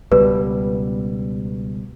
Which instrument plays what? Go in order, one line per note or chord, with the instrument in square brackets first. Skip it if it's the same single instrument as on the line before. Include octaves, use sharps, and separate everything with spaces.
[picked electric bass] C#2 B2 G3 [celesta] B4